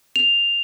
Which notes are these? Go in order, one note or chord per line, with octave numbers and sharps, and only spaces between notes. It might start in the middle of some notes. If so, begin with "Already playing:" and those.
F7